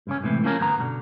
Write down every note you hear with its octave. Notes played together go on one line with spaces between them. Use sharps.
G2 C#3 C#4
C#2 A2 C3 E3
C#3 F3 A#3 C#4 A#4
D2 G2 B3 A#5
B2 D3